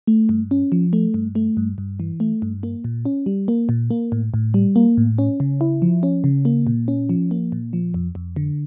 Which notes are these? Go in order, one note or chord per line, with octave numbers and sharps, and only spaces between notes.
A3
G2
C#4
F3
A3
G2
A3
G2
G2
E3
A3
G2
A#3
A#2
C#4
G3
A#3
A#2
A#3
A2
A2
G3
A#3
A2
C#4
C#3
E4
F3
C#4
C#3
A#3
A#2
C#4
F3
A#3
A#2
F3
F2
F2
D3